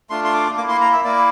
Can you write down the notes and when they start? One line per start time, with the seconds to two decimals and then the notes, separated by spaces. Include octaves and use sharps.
0.10 A3 D4 F4 C6
0.24 C6
0.34 D6
0.57 A#3 D6
0.62 E4
0.69 C6
0.81 A#5
0.93 E5
1.04 A#3 E4 D5